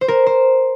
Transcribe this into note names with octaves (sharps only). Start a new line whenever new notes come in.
C5
A#4
C5